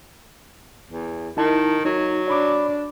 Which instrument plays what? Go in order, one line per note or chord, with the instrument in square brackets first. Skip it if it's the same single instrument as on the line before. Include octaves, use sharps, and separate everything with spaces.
[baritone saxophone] E2
[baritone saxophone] D#3 [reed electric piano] D#4 E4 A5
[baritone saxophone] F#3 [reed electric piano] D#4
[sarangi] D4 [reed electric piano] C#5 B5 D6